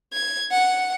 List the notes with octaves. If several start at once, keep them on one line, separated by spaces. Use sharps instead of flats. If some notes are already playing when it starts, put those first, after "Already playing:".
G#6
F#5